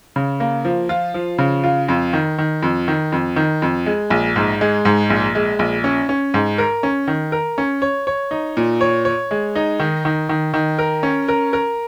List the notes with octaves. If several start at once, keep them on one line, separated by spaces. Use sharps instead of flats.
C#3
A#3
F3
F4
F3
C#3
F4
F2
D#3
D#3
F2
D#3
F2
D#3
F2
G#3
A#1
G#2
G#3
G#2
A#1
G#3
A#1
C#4
C#4
G#2
A#4
C#4
D#3
A#4
C#4
C#5
C#5
D#4
A#2
C#5
C#5
G#3
D#4
D#3
D#3
D#3
D#3
A#4
C#4
A#4
A#4